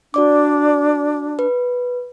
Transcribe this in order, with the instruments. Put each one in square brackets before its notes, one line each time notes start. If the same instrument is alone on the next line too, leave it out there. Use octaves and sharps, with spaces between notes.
[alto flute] D4 [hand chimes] F#4 D5 D6
[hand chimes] B4